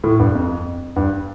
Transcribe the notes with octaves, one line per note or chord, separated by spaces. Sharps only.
A2
G2
F2
G2